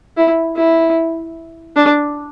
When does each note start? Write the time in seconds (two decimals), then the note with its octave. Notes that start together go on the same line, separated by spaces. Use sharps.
0.17 E4
0.57 E4
1.76 D4